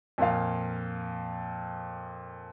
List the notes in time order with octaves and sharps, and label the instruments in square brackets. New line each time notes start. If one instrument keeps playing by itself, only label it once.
[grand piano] F2 A#2 F5